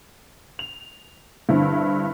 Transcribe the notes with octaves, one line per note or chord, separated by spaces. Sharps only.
F7
G2 D3 C4 E4